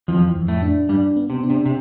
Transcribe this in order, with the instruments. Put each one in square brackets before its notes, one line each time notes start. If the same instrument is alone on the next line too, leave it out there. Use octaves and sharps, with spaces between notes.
[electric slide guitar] F2 F3 [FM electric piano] E3
[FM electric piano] F2
[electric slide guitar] A2 A3
[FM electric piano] D4
[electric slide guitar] G2 G3 [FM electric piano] D4
[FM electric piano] B3
[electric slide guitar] C3
[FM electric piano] D4
[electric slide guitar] C3
C3